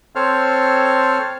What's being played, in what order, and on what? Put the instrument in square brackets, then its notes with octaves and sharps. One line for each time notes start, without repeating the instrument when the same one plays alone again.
[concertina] C4 A4 C5 C#5 F6